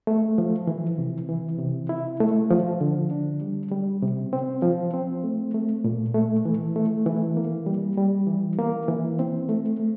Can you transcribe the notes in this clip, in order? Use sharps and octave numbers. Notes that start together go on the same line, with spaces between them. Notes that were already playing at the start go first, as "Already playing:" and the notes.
A3
F3
E3
C3
E3
C3
E4
A3
F3
D3
D4
G3
G3
C3
C4
F3
C4
A3
A3
A#2
A3
E3
A3
E3
A#3
G3
G3
E3
A#3
E3
C4
A3
A3